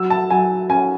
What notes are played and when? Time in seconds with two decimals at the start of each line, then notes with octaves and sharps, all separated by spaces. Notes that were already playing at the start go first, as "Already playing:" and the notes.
Already playing: F#3 E6
0.10 A5
0.30 F#3 G#5
0.70 C#4 G#5